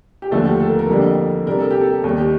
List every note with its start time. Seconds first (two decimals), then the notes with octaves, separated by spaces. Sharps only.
0.22 G4
0.30 D#2 D3 F3 A3 D4 A4
0.45 G4
0.60 A4
0.69 A#4
0.79 A#4
0.89 F2 D3 G3 A#3 D4
1.47 C3 G3 D4 A#4
1.59 A4
1.71 G4
1.81 A4
2.04 D#2 D#3 G3
2.18 G4